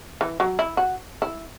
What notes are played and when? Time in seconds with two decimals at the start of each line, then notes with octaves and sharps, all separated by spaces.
0.21 E3
0.40 F#3
0.59 E4
0.77 F#4
1.22 E4